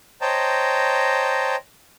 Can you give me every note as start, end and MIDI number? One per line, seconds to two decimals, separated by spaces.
0.21 1.56 72
0.21 1.56 73
0.21 1.56 75
0.21 1.56 79
0.21 1.56 81
0.21 1.56 82